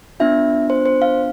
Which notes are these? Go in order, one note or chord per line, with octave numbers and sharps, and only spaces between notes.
B3 D4 F4 E5
C5
C5
F5